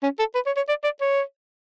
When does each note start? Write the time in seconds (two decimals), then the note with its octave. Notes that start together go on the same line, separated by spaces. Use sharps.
0.03 C#4
0.19 A4
0.35 B4
0.46 C#5
0.57 C#5
0.69 D5
0.84 D5
1.01 C#5